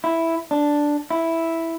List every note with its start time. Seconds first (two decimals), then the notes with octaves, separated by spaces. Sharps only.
0.04 E4
0.51 D4
1.11 E4